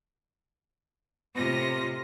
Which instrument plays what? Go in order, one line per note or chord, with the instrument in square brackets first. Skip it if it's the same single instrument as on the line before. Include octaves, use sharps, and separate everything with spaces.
[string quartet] A2 C3 F4 D#5 A#6